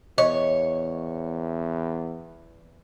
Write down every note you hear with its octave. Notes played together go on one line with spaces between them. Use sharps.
E2 C#5 D#5